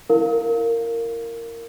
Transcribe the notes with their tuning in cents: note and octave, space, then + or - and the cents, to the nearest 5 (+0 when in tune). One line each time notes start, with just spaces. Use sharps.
E4 +0 A#4 -15 F5 +0